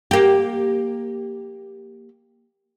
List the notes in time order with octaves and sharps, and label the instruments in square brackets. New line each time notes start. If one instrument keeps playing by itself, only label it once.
[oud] A#3 G4